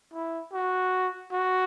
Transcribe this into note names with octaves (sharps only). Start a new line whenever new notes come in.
E4
F#4
F#4